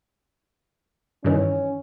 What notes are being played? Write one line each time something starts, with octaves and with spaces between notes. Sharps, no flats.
G2 D#3 E3 C#4